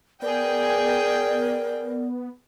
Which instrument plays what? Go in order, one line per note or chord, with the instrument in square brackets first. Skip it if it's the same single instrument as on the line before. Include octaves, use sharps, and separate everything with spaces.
[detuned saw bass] B3 [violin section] G#4 G5 [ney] A#4 [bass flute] D5